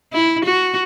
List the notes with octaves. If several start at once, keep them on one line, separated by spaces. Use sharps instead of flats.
E4
F#4